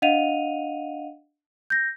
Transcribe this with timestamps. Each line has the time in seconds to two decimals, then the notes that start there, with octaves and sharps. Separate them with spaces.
0.02 D4 D#5 F5 F#5 D#7 F7
1.70 G6 A#6